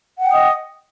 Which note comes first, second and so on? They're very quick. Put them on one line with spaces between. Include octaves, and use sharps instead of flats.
F#5 G5 D#6 D#5